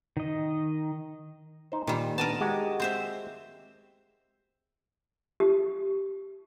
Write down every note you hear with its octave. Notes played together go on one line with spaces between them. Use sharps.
D#3 D#5
D#4 C5
A#2 D#3 G3
B3 D4 A#4 D#5 A5
G#3 F#4 G4
C4 C5 E5
G4